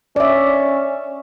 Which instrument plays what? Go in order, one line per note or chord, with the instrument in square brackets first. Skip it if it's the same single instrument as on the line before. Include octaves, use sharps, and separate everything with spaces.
[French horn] C#4 [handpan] D5 E5